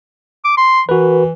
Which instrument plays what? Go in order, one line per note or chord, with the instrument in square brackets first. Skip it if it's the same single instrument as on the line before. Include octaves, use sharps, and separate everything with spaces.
[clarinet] D6
C6
[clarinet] E3 [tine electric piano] F#4 A#4 B4